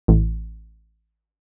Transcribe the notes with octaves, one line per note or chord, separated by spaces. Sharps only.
A1